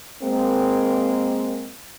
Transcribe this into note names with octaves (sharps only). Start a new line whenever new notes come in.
G#3 A#3 C4